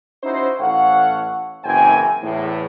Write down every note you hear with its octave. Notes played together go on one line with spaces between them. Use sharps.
C#4 D#4 E4 F#4 C5
A1 A4 C#5 F5 F#5
F#1 F#2 E3 C4 G5 G#5
E2 A2